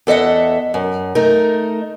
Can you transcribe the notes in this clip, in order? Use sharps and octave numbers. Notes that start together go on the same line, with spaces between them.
E2 A4 D#5 E5 F#5
F#2
A3 D#4 A#4